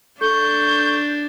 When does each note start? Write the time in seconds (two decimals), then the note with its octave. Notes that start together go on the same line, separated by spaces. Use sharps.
0.21 D4 A4 C#6 G6